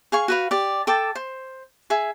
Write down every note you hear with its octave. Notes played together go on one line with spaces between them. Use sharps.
G#4 F5 C#6
F#4 B4 F5
G4 D5
A4 G5 A5 D6
C5
G#4 E5